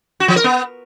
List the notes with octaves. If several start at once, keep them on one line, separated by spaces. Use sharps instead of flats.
F#4
F3
A#4
B3